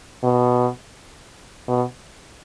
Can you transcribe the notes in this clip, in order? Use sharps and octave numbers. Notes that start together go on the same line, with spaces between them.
B2
B2